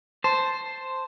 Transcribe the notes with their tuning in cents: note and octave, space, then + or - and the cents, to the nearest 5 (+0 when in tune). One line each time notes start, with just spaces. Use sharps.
C5 +0 A5 +0